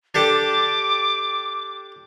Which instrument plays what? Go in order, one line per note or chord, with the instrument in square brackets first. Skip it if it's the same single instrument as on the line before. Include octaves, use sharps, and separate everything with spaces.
[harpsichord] D4 G4 A4 [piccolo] D6